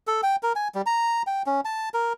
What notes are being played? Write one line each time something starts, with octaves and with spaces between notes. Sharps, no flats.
A4
G5
A#4
G#5
G3
A#5
G5
C#4
A5
A#4